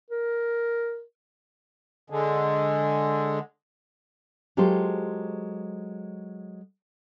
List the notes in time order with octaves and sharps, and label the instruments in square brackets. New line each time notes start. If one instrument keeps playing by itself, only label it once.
[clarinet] A#4
[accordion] D3 G#3
[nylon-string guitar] F#3 G#3 F4 G4 A4 C5